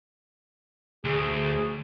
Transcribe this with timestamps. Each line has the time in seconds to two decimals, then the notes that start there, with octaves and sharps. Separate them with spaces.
1.05 D2 G#4